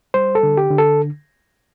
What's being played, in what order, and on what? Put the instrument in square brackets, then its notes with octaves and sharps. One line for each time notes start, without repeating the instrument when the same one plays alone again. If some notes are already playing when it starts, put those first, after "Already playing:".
[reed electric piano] G3 C5
A4
D3
G4
D3
A4